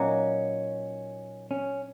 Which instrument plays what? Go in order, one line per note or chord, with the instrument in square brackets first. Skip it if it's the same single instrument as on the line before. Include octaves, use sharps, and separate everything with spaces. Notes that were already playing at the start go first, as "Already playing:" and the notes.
Already playing: [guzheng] A#2 F#3 A#3 D#4 F#4 [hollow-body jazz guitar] C#4
[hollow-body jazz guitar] C#4